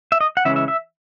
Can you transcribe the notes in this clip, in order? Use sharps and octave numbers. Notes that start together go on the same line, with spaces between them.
E5
D#5
F#5
C#3 E3 G#3 C#4 E5
E5
E5